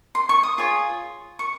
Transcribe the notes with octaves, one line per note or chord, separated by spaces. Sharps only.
C6
C#6
D#6
F4 G#4 C#5
C#6